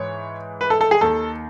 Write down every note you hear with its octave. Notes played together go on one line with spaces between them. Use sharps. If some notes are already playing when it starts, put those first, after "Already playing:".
Already playing: G#2 E3 C#5
B4
A4
A4
G#4
D#2 D#3 A4